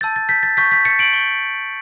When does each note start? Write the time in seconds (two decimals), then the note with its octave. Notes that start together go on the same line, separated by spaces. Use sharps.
0.01 A5 E6 G6 A6
0.16 A6
0.29 G6 B6
0.43 A6
0.57 C#6 G6 B6
0.72 G6 B6
0.85 A6 C#7
0.99 D7 F#7
1.13 C#6 G6